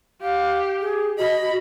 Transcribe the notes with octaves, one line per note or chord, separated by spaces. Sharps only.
G4 F5
G#4
F#4 D#5 B5